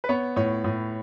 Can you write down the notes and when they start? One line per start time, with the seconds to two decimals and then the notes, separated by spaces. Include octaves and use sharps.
0.04 B4
0.09 B3 C#5
0.36 A2 C#5
0.64 A2